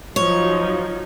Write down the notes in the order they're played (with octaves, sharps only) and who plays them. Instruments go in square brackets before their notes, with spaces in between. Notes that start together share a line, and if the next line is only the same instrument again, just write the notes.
[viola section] F3 F#3 D#4 [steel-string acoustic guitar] C#5